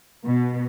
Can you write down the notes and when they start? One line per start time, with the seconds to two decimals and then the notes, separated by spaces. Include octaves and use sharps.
0.24 B2